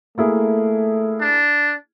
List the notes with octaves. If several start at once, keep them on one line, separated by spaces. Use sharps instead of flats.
A3 A#3 E4 G#4
D4